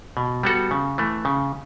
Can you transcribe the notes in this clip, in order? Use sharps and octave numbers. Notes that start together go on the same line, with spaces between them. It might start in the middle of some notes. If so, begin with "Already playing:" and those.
B2
G3 B3 F#4 A4
C#3
E3 A3
C#3